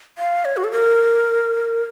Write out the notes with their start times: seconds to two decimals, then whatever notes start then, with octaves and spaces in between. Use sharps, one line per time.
0.18 F5
0.45 C#5
0.57 F#4
0.64 A4
0.72 A#4